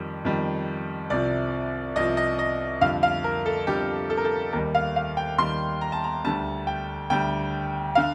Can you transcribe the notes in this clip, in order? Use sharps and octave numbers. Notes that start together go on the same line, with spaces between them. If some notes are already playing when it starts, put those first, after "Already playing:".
Already playing: F2 D#3 G3
F2 D#3 G3
C2 C3 F3 D5
C2 C3 F3 D#5
D#5
D#5
F2 D3 G3 F5
F5
A#4
A4
F2 D3 G3 G4
A4
A#4
A4
D#2 D#3 G3 A#4
F5
F5
G5
D#2 D#3 G3 C6
A#5
A5
A#5
D2 D3 G3 A5
G5
D2 D3 G3 G5
D3 F5